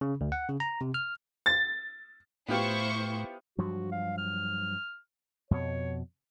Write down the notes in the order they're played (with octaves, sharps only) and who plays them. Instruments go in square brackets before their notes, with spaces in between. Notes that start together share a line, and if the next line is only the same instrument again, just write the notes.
[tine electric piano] C#3
D2
F#5
C#3
A#5
C3
F6
[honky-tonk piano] A6
[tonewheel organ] A2 [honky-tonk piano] B3 F4 G4 [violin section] E4 C5 C#6
[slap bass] G2 F3 F#3 [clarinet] F#4
[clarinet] F5
F6
[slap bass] F2 B2 [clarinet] C#5